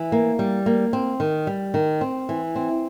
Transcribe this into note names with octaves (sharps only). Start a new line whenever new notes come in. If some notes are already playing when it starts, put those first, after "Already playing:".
Already playing: E3
A#3
G3
A#3
C4
D#3
G3
D#3
C4
E3
C4